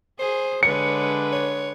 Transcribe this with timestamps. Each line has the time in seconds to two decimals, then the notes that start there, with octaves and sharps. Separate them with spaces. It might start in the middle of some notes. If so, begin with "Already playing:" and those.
0.19 G#4 C5
0.63 D3 G#3 B4 C#5 C#7
1.32 C#5